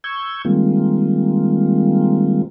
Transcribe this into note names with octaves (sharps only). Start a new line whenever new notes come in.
C#6 E6 G6 G#6
D#3 G3 G#3 A#3 C4 F4